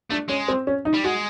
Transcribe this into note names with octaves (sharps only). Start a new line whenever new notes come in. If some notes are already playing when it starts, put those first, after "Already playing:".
A3 D4
G#3 C#4
C4
C#4
D#4
G3
G#3 F#4